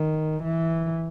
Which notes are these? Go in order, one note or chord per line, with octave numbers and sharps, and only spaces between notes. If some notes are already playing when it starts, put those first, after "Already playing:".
Already playing: D#3
E3